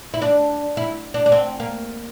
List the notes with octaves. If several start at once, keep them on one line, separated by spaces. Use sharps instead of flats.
E4
D4
E4
D4
D4
C4
A#3